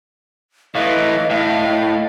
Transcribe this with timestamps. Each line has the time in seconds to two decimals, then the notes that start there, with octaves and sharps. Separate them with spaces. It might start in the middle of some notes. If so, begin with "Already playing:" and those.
0.75 A2 E3 D#5 F5
1.30 A2 D#5 F5